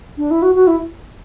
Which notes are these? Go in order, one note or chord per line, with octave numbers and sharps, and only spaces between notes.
D4
E4
F#4
F#4
E4